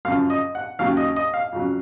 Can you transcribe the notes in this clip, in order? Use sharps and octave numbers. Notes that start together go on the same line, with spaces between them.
F#2 C#3 F3 F5
D#5
F#5
D#2 C#3 F#3 F5
D#5
D#5
F5
F2 C#3 F#3